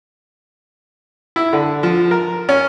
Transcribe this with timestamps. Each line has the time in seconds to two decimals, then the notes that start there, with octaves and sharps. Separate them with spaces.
1.36 E4
1.53 D3
1.83 F3
2.11 A#4
2.49 C#4